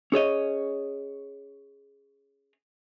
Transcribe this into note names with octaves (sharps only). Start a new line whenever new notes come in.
C#4 G#4 C#5 D#5